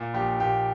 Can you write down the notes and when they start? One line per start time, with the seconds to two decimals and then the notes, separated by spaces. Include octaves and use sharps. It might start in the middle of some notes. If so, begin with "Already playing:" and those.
Already playing: A#2
0.14 A#1 G4
0.40 A#2 G4